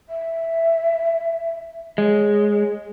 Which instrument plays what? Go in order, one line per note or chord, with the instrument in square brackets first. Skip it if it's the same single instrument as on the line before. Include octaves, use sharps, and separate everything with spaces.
[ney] E5
[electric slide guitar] G#3 [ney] C#5